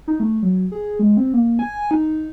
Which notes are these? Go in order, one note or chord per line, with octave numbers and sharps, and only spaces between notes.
D#4
A3
F#3
G#4
G#3
C4
A#3
G#5
D#4